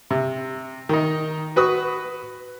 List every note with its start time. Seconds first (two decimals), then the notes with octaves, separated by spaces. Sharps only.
0.11 C3
0.89 D#3 D#4
1.56 F#4 B4 C#6 D#6